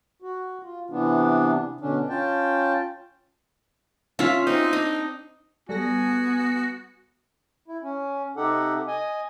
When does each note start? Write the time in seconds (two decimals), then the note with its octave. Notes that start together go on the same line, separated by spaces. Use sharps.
0.22 F#4
0.63 F4
0.90 C3 E3 B3 D4
1.81 B2 D3 C#4 D4
2.09 C#4 F4 G5 A5
4.19 C#4 F4 E5
4.47 C4 D#4
4.73 D4 D#5
5.69 G3 B3 F#4 A4 G#5 A#6
7.68 E4
7.83 C#4
8.37 C3 D#4 G4 A4 F#5
8.88 D#5 G#5